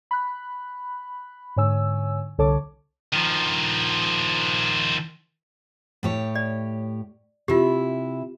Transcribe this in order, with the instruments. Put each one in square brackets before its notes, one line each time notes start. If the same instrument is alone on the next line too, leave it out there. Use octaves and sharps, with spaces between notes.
[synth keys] B5 F#6
G#2 D3 C#5 G#5 E6
C2 D3 A4 C#5 A5 D6
[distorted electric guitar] D#3 F3
[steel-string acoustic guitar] A2 G4 C#5
[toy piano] D5
[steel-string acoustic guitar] C3 E4 [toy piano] F4 G4